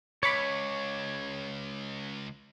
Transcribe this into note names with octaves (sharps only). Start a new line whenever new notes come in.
C#2 C#5 B5 D6 C#7